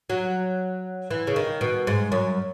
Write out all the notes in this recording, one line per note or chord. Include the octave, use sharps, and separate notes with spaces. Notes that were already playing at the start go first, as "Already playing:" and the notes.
F#3
E3
C#3
D#3
B2
G#2
F#2